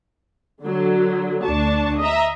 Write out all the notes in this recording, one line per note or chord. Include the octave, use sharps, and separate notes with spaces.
D3 F#3
D2 D4 A5 C#6
D#5 E5 A#5